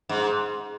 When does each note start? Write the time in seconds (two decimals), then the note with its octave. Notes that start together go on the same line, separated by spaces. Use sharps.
0.09 G#2